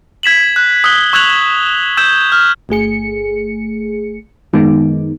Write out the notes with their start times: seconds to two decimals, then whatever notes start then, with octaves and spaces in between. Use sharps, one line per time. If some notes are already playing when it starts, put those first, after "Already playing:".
0.23 G#6 B6 E7 F#7
0.56 F#6
0.84 D#6 E6 F#6 G7
1.13 C#6 E6 F#6 G#6 F7 F#7
1.97 E6 G6 G#6 E7
2.32 F6
2.69 G1 A3 G#4 C#7
4.53 F#2 D#3 G#3 B3 D#4